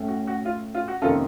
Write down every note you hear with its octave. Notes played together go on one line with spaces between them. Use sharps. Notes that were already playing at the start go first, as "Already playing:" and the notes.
Already playing: A2 A3 C#4
F#4
F#4
F4
F4
F#4
F2 C3 D#3 A#3 C#4 F4 A4